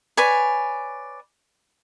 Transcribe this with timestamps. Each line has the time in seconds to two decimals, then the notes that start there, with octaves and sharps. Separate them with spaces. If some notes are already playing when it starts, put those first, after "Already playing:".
0.17 B4 C#5 D5 G#5